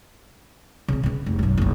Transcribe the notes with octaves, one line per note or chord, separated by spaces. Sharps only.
C#3 C4
C#3 B3
F1
B1 F#2
F#1 B1